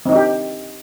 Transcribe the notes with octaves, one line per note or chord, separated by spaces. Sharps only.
C4 D4 D#4 G4